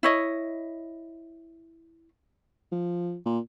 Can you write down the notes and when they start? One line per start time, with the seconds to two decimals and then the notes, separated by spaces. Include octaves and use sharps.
0.03 E4 C#5 D#5
2.72 F3
3.26 A#2